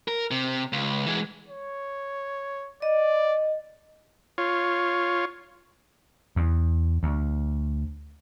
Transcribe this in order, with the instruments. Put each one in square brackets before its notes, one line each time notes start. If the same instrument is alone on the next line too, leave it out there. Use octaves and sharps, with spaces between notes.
[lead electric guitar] A#4
C3
C#2
E3 G#3
[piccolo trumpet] C#5
[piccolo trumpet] D5 [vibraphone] D#5
[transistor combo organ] F4 C#5
[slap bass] E2
D2